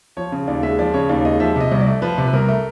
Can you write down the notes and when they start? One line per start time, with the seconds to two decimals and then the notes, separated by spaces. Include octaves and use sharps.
0.17 F3 C#5
0.32 C#3
0.47 D#2 D5
0.63 G#3 E5
0.79 F3 D5
0.94 C#3 C#5
1.09 D#2 D5
1.25 G#3 D#5
1.40 F3 E5
1.56 C3 D#5
1.72 C2
1.81 D5
1.87 A3
2.02 F3 B4
2.18 C3
2.27 B4
2.33 C2 A#4
2.49 A3